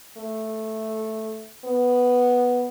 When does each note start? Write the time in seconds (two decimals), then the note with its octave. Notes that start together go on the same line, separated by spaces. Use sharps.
0.17 A3
1.65 B3